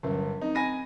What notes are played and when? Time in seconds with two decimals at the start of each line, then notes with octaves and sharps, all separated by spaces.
0.03 G1 F#3 C#4 A#4
0.41 C4 D#4
0.55 C4 G#5 B5 A#6 D#7